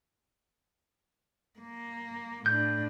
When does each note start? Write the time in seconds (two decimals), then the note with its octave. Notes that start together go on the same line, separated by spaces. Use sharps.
1.60 A#3
2.46 A2 D4 G6